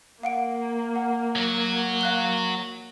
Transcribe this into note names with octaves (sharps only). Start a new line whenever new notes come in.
A#3 F5 F#5 D7
F#5
F#3 F#4
F5 F#6 G7